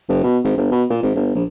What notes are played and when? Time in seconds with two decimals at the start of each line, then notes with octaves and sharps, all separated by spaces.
0.09 F#1
0.23 B2
0.44 G#1
0.58 G1
0.71 B2
0.90 A#2
1.02 G#1
1.15 G1
1.35 A#1